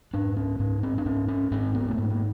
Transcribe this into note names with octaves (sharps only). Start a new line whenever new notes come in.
G#2 D4
C#4
G#2 C#4
C4
D4
G#2 C#4
C#4
G#2 C4
B3
A3
G#2 A#3
A#3